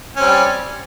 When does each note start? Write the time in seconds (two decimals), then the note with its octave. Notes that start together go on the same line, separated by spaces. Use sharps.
0.16 C#4
0.19 C4
0.22 G3